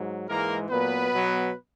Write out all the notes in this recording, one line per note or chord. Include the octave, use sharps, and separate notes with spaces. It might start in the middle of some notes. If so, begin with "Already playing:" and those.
Already playing: G#2 F#3
G#2 E3 G#3 A#3 A#4
A#2 F#3 B3 B4
B2 F#3